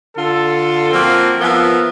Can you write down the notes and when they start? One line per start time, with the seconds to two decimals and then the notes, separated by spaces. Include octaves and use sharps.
0.16 D3 F4 A4
0.93 F3 A#3 C4 F#4
1.41 F3 B3 A#4 E5